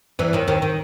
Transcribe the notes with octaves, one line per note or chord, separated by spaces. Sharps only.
E2 E3
D#2 D#3
D#2 D#3
D#3